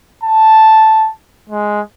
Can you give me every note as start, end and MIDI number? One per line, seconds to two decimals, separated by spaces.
0.23 1.09 81
1.50 1.81 56